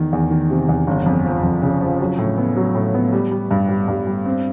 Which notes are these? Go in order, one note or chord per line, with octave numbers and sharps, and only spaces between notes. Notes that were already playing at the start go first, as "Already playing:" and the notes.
Already playing: E2 D#3
E2
D#3
C3
E2
G1
F2
F3
F2
C#3
F3
F#3
A2
B3
F#3
A2
B3
G3
G3
G2
G3
G2
G3
C4